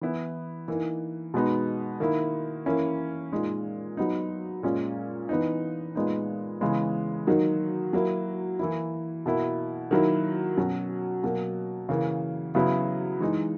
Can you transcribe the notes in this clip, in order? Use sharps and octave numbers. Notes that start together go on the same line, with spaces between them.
E3 B3 E4
E3 A#3 D#4
B2 G#3 B3 D#4
D#3 A#3 E4
E3 A#3 C#4 E4
A#2 G#3 D#4
F#3 B3 D#4
A#2 G#3 C#4
E3 B3 D#4
A#2 G#3 B3 D#4
C#3 E3 G#3 B3
D#3 F#3 A#3 D#4
F#3 A#3 E4
E3 A#3 E4
B2 A#3 E4
D#3 F#3 A#3 E4
B2 F#3 C#4
B2 F#3 A#3
C#3 E3 A#3
C#3 F#3 B3 E4
E3 G#3 D#4